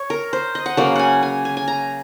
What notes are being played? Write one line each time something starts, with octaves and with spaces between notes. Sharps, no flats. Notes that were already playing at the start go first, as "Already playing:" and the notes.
Already playing: C#5
A#4
C5
D#5
F#5
C#3 F#3 A#3 F5
F#5 G#5
G#5
G#5
G#5
A#5